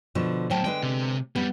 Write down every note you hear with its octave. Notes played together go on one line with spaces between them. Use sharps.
B2 D3 F3
A2 F#3 C5 G5 A5
D3 G#3 B4 G5
C3
F2 G3 B3